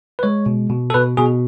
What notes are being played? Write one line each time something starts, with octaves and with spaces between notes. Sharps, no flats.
B4
G#3 C#5
B2
B2
A4
B2 B4
B2 G#4